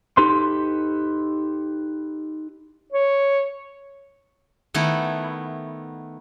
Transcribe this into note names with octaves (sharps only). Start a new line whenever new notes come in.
D#4 G4 A4 B4 C6
C#5
D#3 A3 B3 E4